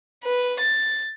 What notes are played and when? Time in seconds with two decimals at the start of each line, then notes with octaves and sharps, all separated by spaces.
0.24 B4
0.60 A6